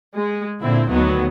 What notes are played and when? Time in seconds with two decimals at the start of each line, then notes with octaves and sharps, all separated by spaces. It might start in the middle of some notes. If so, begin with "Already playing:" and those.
0.16 G#3
0.61 A#2 D3 C4 E4
0.91 D2 D#3 F#3 B3